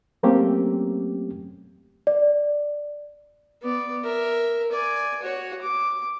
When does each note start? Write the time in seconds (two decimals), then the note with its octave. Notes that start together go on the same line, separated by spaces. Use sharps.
0.23 F#3 A3 A#3 C4 C#4 G4
2.07 D5
3.62 B3 D5
4.04 A#4 E5
4.72 D5 G#5
5.22 F#4 C#5
5.62 D6